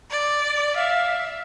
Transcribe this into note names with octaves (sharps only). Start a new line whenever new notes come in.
D5
E5 F5